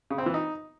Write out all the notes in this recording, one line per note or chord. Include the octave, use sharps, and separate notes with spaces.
C#3
C4
E3
D#4